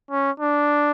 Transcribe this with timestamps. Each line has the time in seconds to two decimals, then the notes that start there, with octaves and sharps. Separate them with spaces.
0.11 C#4
0.40 D4